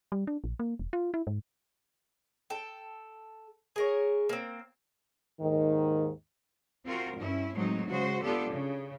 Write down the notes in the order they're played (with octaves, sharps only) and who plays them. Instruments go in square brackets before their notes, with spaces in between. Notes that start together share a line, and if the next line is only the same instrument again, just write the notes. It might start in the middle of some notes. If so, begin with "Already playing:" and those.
[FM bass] G3
D4
A#1
A#3
E1
F4
E4
G#2
[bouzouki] A4 G5
G#4 A#4 C#5
A#3 C4
[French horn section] D#2 G#2 D#3
[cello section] C4 F4 F#4 A#4
G2 C#4 E4
A2 F#3 G#3 C4 D#4
C#3 G#3 F#4 C5
B3 D4 F4 G4 A4
C#3